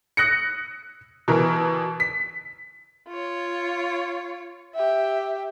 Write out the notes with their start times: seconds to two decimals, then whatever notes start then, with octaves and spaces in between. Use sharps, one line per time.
0.17 D#6 F#6 A#6 C#7
1.28 B2 E3 A#4
2.00 B6
3.08 F4 C#5
4.74 G4 E5